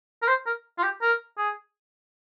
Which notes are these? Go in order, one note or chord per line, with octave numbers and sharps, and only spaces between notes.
A#4
C5
A#4
F4
G4
A#4
G#4